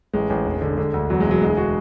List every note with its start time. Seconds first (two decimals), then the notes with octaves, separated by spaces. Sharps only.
0.13 A1 G#3
0.30 A1
0.46 E1
0.62 D3
0.78 D3
0.94 D2
1.10 E2 F#3
1.20 G#3
1.26 E1 F#3
1.41 D2 G#3
1.50 G#4
1.57 F#4